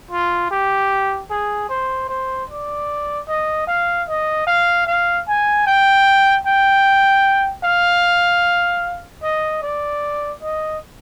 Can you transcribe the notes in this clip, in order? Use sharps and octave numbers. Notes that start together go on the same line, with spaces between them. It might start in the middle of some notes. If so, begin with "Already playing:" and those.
F4
G4
G#4
C5
C5
D5
D#5
F5
D#5
F5
F5
G#5
G5
G5
F5
D#5
D5
D#5